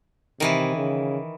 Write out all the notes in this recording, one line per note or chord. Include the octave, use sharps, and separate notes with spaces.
C3 D#3 E3 E4
C#3